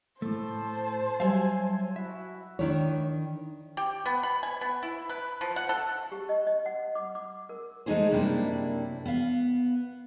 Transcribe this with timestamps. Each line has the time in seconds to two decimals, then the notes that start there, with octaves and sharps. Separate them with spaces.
0.22 A2 A3 C5 A5
1.20 F#3 G3 C#5 E5 F5 G#5
1.96 E4 F#4 E5
2.59 D#3 D4 E4 C#5
3.77 G4
4.06 B3
4.23 B5
4.43 G#5
4.61 B3
4.83 E4
5.09 B4
5.41 F3
5.56 F#5
5.69 A4
6.12 G4
6.29 D#5
6.47 D#5
6.66 F#5
6.95 D6
7.15 D6
7.49 A#4
7.86 G#3 A3 C4 D#4 G#4 C5
8.11 F#2 C3 G3 A#3 D4 E4
9.06 B3 F5